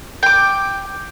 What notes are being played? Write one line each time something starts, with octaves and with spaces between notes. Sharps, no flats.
G5 D6